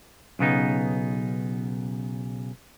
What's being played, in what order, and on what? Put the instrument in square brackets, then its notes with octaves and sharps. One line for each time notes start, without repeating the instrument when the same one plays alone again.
[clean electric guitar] B1 C#3 B3 D#4